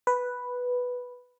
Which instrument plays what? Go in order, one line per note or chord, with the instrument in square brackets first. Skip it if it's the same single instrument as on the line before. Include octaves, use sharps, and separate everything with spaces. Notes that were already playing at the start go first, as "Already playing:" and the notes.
[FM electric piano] B4